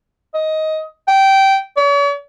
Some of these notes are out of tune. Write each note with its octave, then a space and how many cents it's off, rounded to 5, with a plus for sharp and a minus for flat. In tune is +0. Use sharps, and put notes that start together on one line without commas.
D#5 +15
G5 -15
C#5 +45